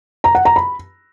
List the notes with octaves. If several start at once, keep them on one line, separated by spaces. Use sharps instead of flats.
A#5
F#5
A#5
B5